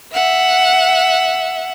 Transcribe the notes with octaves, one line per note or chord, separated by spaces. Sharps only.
E5 F#5